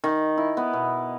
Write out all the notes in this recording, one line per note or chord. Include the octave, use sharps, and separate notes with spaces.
D#3
E4
B3
B2